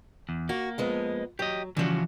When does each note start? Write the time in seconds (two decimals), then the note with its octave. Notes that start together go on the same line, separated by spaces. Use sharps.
0.29 E2
0.49 A#3 F#4
0.78 F2 G#3 B3
1.39 F#3 G4 D#5
1.77 C#3 E3 F3 G3 F#4